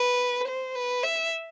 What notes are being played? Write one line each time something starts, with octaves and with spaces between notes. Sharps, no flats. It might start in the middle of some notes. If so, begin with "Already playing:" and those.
Already playing: B4
C5
B4
E5